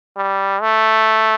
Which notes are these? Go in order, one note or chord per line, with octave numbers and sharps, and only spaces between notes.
G3
A3